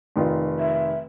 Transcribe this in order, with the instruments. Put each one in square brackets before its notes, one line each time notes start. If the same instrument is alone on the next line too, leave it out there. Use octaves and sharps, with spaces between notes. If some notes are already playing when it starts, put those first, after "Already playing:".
[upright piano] F1 D#3 F4
[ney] E5